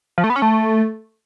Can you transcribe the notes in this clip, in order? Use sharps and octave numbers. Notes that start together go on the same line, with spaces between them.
F3
A3
B3
C#4
A3